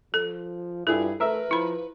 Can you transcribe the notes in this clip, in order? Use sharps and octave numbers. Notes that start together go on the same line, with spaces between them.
F3 A4
G2 E4 F4 G#4 A4
A3 A#4 B4 E5
F3 E4 B5